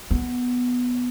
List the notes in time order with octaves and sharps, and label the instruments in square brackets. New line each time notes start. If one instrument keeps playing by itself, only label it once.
[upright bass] B3